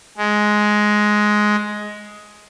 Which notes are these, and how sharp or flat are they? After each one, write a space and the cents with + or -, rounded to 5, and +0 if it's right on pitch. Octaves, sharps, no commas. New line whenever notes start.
G#3 +10